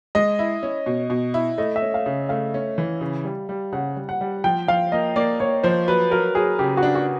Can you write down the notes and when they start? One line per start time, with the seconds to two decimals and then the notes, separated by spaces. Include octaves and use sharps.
0.15 G#3 D#5
0.39 E4
0.63 C#4
0.86 B2
1.10 B2
1.34 E4
1.58 A3 D#5
1.76 E5
1.82 C#4
1.94 F5
2.06 C#3
2.29 A3 F5
2.54 C#4
2.78 E3
3.01 C#3
3.25 G3
3.49 G3
3.73 C#3 F#5
3.96 G3
4.09 F#5
4.21 G3
4.44 F3 G5
4.68 F3 F5
4.92 A#3 D#5
5.16 A#3 D5
5.40 A#3 C#5
5.63 F3 C5
5.88 F#3 B4
6.11 F#3 A#4
6.35 F#3 G#4
6.59 C#3 G4
6.77 F#4
6.82 D4
6.95 F#4